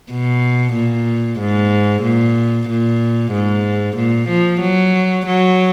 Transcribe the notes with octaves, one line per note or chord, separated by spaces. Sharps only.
B2
A#2
G#2
A#2
A#2
G#2
A#2
F3
F#3
F#3